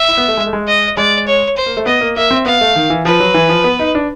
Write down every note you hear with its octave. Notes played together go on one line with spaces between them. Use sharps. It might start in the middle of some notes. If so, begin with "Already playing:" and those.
Already playing: E5
E4
B3
A3
G#3
A3
G#3
D#5
G#3 D5
C#5
C5
A#3
A3
B3 D#5
A#3
A#3 E5
C4
B3 F5
A3
D#3
E3
F3 B4
F#3
E3
F3
B3
D#4
D4